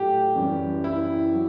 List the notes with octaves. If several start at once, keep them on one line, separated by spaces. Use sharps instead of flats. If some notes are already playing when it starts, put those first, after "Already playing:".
Already playing: A2 F#3 A3 G4
F#2 E3 G3
E4
F#3